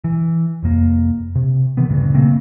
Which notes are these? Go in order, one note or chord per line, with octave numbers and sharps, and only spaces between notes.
E3
F1 F2 A#3
C3
C3 D#3 E3 B3
D2 G2 A#2 C#3
C#3 A3 A#3 C4